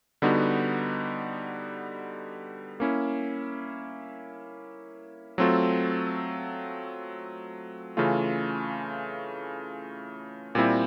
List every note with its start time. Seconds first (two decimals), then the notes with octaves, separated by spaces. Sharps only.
0.22 D3 G3 B3 D#4 F#4
2.80 A#3 C#4 E4
5.38 F#3 A3 C4 F4 A4
7.97 C#3 E3 A3 C#4 F4
10.55 A#2 G3 C4 E4